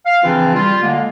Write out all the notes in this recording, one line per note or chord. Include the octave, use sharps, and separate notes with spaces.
F5
C#3 E3 F3 C4 D4 F4
G3 F4
D3 G#3 A#3